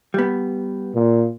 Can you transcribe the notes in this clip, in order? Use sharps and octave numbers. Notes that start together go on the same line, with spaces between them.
G3 B3
A#2